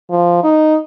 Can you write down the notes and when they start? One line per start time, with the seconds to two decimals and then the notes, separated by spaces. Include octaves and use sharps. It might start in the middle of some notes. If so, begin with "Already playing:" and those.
0.10 F3
0.44 D#4